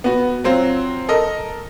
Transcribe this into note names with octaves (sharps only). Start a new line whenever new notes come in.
B3 F#4
F#3 C4 F4
A4 A#4 D#5